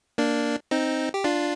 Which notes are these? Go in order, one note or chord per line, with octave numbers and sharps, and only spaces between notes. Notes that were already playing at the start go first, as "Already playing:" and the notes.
A#3 D4
C4 D#4
G4
D4 F4